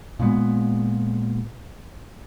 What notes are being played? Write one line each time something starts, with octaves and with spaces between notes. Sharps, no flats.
A#2 G#3 B3